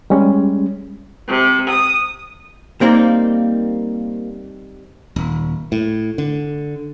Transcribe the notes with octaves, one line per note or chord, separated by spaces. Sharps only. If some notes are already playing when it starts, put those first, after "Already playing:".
G3 G#3 C#4
C3
D#6
G3 A#3 C4 D#4
D#1
A2
D3